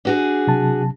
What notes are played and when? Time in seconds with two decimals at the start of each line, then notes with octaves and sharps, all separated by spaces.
0.05 D4 F#4 G#4
0.47 C3 F#3 A5